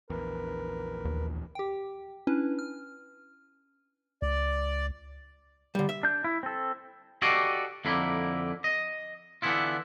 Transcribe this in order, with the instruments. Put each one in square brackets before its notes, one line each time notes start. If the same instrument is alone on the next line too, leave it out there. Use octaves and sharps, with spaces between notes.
[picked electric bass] A#1 E2 [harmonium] A#4 B4
[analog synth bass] D#2
[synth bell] G4 G5
C#4 D4 E4 B4
F6
[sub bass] C#2 [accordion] D5
[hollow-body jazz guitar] D3 G3
E5
[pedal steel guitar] D4 G6
E4
C4 A4
[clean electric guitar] F#4 G4 A4 D5 D#5 F5
F2 D3 A#3 E4
D#5
D3 E3 B3 E4 F4